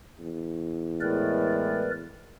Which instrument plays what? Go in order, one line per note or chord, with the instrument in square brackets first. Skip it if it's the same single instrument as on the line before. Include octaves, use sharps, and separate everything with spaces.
[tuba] E2
[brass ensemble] A2 G#3 [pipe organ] A#4 B4 D5